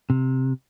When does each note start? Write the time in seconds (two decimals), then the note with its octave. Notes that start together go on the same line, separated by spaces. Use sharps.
0.10 C3